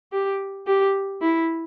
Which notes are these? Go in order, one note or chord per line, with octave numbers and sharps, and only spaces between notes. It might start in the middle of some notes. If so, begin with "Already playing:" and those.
G4
G4
E4